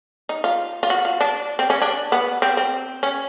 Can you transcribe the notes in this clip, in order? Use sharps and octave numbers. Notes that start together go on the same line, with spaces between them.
D#4
F4
F4
F#4
F4
D4
C4
C#4
D4
B3
C4
C4
C#4